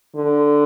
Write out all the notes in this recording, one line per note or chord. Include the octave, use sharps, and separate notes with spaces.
D3